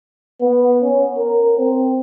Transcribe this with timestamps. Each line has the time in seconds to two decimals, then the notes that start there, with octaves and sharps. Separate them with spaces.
0.41 B3
0.83 C#4
1.18 A#4
1.59 C4